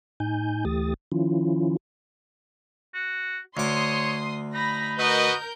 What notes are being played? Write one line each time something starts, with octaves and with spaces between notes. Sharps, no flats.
A2 D#4 G#5 G6
D2 E3 A3 G4 D#6 A6
D#3 F3 C#4 E4 F4
F#4
D2 C#5 C6 D6 D#6
D#4 B5 A#6
F#4 A#4 B4 D#5 G6